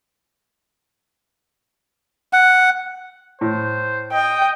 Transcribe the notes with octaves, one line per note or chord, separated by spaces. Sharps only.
F#5
A2 C5
D#5 G5